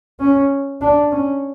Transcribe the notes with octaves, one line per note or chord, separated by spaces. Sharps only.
C#4
D4
C#4